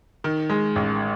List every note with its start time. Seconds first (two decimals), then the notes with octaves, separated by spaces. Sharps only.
0.24 D#3
0.50 G#3
0.76 A1